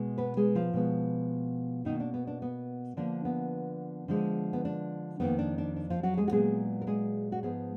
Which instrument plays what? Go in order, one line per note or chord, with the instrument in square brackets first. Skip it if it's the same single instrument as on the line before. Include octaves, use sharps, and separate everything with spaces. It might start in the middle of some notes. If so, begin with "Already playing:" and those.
Already playing: [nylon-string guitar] B2 G#3
B3 B4
G#3 G#4
F3 F4
B2 G#3 B3
B2 D#3 A#3 D#4
D4
B3
D4
B3
D3 F3 A#3 D4
B3
D3 F3 G#3
B3
D4
F2 D#3 A#3 B3
D4
D4
D4
F3 F4
F#3 F#4
G#3 G#4
F#4
A#2 F#3 G#3 B3 G#4
A#4
G#3 G#4
F#4
G#2 F3 G#3 B3 G#4